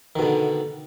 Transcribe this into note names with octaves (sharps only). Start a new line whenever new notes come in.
B2 D3 D#3